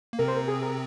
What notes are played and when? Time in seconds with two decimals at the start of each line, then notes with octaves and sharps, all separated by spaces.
0.13 A#3
0.19 C3 C4 A#4
0.28 C5
0.37 A#4
0.48 G#4
0.62 A#4